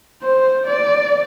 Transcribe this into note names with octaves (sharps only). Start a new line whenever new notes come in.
C5
D5